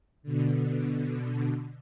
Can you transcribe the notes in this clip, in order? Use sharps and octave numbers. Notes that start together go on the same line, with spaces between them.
B2 D3